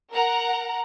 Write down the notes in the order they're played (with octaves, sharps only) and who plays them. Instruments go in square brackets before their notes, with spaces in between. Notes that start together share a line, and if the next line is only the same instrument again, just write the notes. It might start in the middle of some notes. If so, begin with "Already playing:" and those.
[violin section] A#4 F#5 A#5